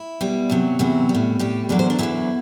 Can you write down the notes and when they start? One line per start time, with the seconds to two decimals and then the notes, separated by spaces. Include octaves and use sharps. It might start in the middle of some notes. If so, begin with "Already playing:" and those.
Already playing: E4
0.21 B2 G3
0.50 E2 C3 F#3
0.79 E2 C3 F#3 E4
1.09 G3
1.15 A2
1.39 A2 G3 G4
1.69 E2 D3 F#3 D5
1.79 C5
1.90 D4
1.99 E2 D3 F#3 E4